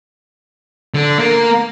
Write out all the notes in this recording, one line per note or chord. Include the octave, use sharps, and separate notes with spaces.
D3
A#3